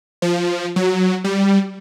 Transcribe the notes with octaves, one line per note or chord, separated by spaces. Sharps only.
F3
F#3
G3